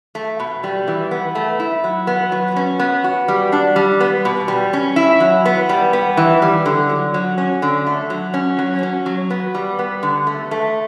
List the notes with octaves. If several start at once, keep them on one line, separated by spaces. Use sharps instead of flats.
A3
B2
G3
E3
B3
A3
E4
F#3
B3
F#3
C#4
B3
F#4
G3
D4
G3
B3
B2
G3
C#4
E4
F#3
B3
G3
B3
E3
G3
D3
F#3
F#3
C#4
D3
A3
F#3
C#4
F#3
C#4
F#3
B3
G3
B3
D3
A3
A3